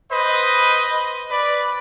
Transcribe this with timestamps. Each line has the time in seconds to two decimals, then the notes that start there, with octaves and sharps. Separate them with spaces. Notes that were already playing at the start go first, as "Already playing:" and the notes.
0.10 B4 C5 D#5
1.30 B4 D5